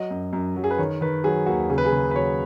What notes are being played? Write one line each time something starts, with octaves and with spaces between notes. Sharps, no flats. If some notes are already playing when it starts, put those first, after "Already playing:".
Already playing: F#3 D#5
F#2
F#2
F#3
G#4
B4
D#3 C#5
D#3 B4
F#3 G#4
D#2 F#4
C#3 G#4
B4
G#4
C#3
B4
F#3 C#5